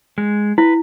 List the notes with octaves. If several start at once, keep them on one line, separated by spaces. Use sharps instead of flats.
G#3
E4 B4